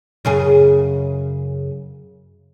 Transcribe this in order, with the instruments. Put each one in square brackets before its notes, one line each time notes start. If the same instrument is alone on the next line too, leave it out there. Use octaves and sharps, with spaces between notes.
[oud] F#2 C#3 G#4